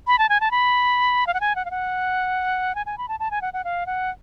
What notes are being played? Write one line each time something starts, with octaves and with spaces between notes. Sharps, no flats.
B5
A5
G#5
A5
B5
F5
F#5
G#5
F#5
F5
F#5
G#5
G#5
B5
A5
A5
G#5
F#5
F#5
F5
F#5